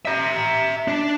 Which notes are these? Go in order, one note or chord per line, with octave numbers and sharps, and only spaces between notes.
E5 A#5
D4